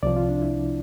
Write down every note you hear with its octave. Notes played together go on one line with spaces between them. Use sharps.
C2 C3 F3 D5
F4
D4
E4